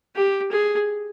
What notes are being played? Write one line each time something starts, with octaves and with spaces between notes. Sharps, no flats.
G4
G#4